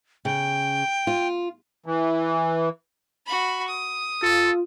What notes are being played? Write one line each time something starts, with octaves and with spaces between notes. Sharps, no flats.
C#3 G5
F4
E3
F#4 B5
D#6
F4 A4